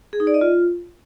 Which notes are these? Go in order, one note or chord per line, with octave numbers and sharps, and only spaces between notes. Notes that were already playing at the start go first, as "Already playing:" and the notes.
G#4
D#4
D5
D#5
F4